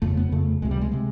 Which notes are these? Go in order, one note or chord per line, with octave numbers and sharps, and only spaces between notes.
F2 C#3 A3
B3
F2 C#3 A3
C#2 C3 G#3
G3
G#3
C3 G#3